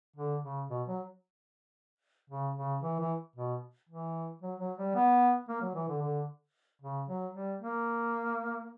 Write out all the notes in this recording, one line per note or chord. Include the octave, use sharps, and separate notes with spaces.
D3
C#3
B2
F#3
C#3
C#3
E3
E3
B2
E3
F#3
F#3
G3
B3
A#3
F#3
E3
D3
D3
C#3
F#3
G3
A#3